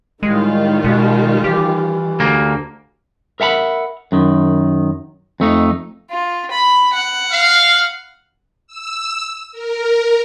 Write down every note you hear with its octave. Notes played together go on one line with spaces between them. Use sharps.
A2 D#3 G3 G#3 F4
B2 G#3
E3 G4
D2 A#3
A#4 E5 F#5 A#5 B5
F#2 D#3
F2 A3 D#4
F4
B5
F#5
F5
E6
A#4